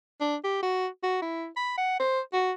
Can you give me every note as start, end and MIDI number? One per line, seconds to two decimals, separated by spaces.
0.21 0.36 62
0.44 0.61 67
0.62 0.87 66
1.03 1.19 66
1.22 1.47 64
1.57 1.77 83
1.78 1.98 78
2.00 2.21 72
2.33 2.53 66